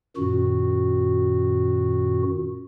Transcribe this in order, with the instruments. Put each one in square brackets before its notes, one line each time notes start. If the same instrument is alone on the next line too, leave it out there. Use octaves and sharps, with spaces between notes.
[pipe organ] F#2 A#2 D#3 F#4